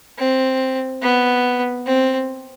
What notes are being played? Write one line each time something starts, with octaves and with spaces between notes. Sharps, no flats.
C4
B3
C4